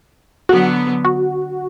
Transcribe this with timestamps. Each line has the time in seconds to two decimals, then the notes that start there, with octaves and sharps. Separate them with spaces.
0.49 D3 F#3 B3 F#4
1.05 F#4